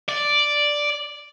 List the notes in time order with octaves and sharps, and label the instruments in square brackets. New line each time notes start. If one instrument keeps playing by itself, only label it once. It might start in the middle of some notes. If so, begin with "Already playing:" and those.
[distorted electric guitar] D5